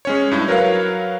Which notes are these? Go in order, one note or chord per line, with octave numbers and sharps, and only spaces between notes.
G#3 C#4 C#5
G2 E4 G#6
F#3 A#4 B4 C#5 F5